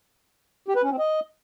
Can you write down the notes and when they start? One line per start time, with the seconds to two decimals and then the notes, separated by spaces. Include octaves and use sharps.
0.68 G4
0.76 B4
0.83 C#4
0.91 C4
0.99 D#5